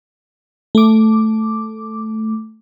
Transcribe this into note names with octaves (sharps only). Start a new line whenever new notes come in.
A3 D6